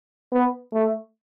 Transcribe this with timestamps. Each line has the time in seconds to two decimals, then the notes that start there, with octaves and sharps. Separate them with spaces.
0.32 B3
0.73 A3